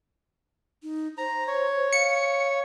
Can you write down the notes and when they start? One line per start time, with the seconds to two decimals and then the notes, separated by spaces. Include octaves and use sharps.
0.83 D#4
1.18 C5 A#5
1.48 C#5
1.93 F5 C#7